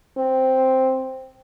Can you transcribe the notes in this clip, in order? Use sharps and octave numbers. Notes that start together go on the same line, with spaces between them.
C4